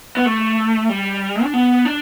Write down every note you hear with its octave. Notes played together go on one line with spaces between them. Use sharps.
B3
A3
G3
D4
B3
D4